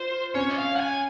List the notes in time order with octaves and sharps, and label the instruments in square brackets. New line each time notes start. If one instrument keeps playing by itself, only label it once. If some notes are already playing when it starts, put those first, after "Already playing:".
Already playing: [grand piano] F4 [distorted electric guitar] C5
[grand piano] C#4 [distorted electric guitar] C#5
[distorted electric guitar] D#5
F5
F#5
G#5